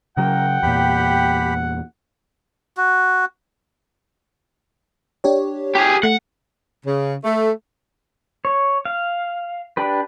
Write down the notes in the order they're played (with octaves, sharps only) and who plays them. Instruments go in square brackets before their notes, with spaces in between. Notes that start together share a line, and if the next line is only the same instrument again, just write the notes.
[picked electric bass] C#3 F#3 [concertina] A#4 [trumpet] F#5 [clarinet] G5
[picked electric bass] E2 A#2 [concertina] G4 B5
[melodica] F#4
[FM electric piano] D4 G4 C#5
[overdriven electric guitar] G4 G#4
[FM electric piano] A3 [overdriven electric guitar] F#5
[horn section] C#3
A3
[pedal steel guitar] C#5
F5
D4 G4 B4